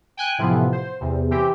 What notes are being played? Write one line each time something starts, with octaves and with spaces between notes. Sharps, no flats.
G5 G#5 F#6
A2 C3 E3 F3 B3
C5
E2 C3
E3 C4 G4